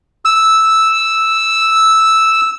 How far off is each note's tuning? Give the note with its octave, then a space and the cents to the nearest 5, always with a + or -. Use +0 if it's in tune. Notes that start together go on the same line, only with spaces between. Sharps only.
E6 -5